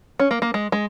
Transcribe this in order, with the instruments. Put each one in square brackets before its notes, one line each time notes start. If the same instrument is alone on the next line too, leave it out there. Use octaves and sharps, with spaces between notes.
[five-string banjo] C#4
A#3
A#3
G#3
G#3